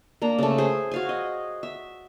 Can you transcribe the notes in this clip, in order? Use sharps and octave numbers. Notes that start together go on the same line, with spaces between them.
A#3 D4 A#5
C#3 A3
G#4 C5
F#4 F5 G#5
D#5
E5